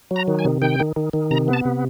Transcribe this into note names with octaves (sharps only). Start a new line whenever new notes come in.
F#3
A#5
D#3
G#5
C3
D#3 G5
D#3
D#3
D#3
C3 A#5
B3
A5
C3